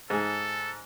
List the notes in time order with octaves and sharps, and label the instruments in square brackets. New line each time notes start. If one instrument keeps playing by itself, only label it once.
[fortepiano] G#2 G#4 [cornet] A4